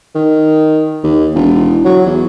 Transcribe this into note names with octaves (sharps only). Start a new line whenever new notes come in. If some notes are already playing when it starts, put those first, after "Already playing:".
D#3
D#2
E1
F#3
E2